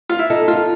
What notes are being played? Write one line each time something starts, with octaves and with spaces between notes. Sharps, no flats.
F4
E4
D#4 A4
F4